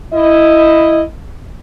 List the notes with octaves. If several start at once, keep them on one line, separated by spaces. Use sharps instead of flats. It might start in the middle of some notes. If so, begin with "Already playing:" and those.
E4 D#5